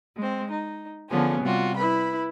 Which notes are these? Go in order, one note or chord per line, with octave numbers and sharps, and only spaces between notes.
G#3 C4
D#4
D3 F3 B3 C#4 G#4
C3 G3 F4 F#4
E4 B4 B5